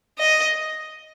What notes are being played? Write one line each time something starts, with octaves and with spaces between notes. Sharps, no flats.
D#5